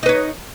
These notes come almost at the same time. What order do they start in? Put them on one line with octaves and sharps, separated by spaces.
D#4 B4 C#5